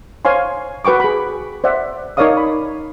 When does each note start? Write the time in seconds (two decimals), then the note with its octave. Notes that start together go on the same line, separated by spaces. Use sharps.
0.25 C5 C#5 F5 G#5 C6
0.85 F#4 B4 G5 C#6 D6
1.00 G#4 B5
1.64 C5 D5 E5 F#5
2.17 D#4 A#4 C#5 D5 F5 D#6
2.37 B5